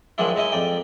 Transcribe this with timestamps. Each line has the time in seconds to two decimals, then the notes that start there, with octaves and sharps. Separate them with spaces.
0.18 D#3 F3 F#3 G#3 D4 E4
0.36 G#3 D#4 E4 D#5
0.52 F2 D5 G5